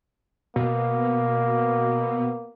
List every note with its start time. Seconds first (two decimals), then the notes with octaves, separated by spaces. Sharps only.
0.56 B2 A#3